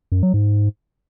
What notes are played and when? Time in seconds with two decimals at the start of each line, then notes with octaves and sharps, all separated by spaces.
0.12 F#2
0.23 F#3
0.34 G#2